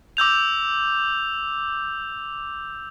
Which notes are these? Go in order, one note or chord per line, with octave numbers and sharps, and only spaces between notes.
D6 E6 G6 F7